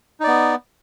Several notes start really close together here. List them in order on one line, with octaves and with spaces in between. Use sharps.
D#4 D5 B3